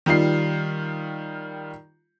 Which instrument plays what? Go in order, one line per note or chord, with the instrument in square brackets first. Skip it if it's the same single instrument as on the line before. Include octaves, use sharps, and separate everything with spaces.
[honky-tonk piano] D#3 G3 F4 C7